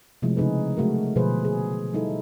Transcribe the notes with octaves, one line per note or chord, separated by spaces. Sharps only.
C3 F3 G#3 A3 E4
C#3 G#3 D#4 G#4 B4
F#3 G#3 A3 F#4 A#4
B2 D3 F3 G#4 B4 C5
G#4
G3 D#4 E4 A4